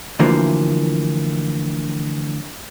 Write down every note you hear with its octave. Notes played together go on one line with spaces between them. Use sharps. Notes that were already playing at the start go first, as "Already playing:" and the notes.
D2 D3 E3 F3 A#3